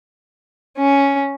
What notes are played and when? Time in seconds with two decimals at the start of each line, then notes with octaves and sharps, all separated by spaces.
0.78 C#4